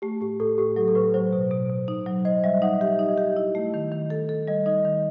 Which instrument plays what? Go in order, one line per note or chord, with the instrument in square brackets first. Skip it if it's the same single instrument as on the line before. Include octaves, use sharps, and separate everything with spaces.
[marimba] A3 [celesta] G4
[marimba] A2 [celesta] G4
[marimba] A2 [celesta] A4
[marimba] A2 [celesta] G4
[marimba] F#3 [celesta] A4
[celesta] A4
[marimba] A2 [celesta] B4
[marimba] F#3 [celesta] C5
[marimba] B2
B2
B2
D#4
F#3
[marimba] C5 [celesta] D#5
[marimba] G3 [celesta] E5
[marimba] D#4 [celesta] F#5
[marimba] G4 [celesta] E5
[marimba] D#4
[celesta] D#5
[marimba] G4
E4
A3
D#3
D#3
A4
A4
[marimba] G3 [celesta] D#5
[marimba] D#4 [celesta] D#5
[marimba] D#3